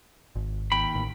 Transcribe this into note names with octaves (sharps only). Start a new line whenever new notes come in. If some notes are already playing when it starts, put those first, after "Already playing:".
G#1
D#2 G5 B5
A1